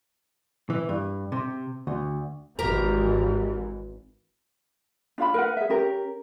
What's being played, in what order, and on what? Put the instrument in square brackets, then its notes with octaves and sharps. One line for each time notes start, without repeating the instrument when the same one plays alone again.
[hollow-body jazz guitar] E3
G2
C3
D2
[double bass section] G#1 G#2 E3 [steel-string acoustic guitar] G4 A#4 A#5
[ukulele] D4 F4 F5 B5
A#4 B4 F#5
G#4 E5
C#4 G4 A#4